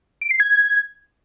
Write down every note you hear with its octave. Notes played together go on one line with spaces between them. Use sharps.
D7
C7
G#6